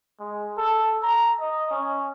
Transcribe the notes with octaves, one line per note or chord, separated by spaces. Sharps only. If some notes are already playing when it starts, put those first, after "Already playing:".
G#3
A4
A#5
D#5
C#4